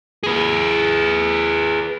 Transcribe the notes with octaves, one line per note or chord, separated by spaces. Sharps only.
G#4 B4